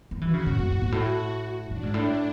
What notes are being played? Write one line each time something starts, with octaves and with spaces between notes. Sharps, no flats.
F#3
E3 F#4
C#3
A2
F#2
A2
G#2
A2
A2 D4
G#2
A2